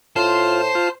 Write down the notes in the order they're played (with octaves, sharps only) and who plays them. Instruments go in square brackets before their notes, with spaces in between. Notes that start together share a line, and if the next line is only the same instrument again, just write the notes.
[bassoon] A2 [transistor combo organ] F4 [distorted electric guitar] C5 [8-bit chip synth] A5
[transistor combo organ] F4